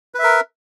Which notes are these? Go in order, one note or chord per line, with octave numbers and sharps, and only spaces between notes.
A#4 B4 E5